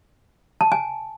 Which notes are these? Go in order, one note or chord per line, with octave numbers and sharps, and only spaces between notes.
A5
G#5